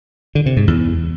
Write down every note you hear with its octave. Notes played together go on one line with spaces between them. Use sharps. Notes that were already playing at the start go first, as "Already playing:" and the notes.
D3
C3
G#2
E2